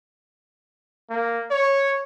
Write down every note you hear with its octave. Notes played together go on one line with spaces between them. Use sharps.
A#3
C#5